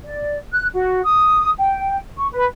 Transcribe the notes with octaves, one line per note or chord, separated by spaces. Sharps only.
D5
F#6
F#4
D#6
G5
C#6
B4